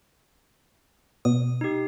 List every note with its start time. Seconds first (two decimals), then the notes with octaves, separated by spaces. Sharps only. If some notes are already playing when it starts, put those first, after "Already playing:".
1.25 B2 D#6
1.61 D#4 G4